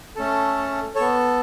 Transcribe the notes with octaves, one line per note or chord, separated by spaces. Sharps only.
A3 C#4 A4
B3 A4 C#5